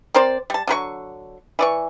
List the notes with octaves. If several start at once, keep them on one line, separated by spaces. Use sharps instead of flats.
C4 A#4 C5 D5
G3 A5
D3 F#3 B4 C#6
E3 D5 C#6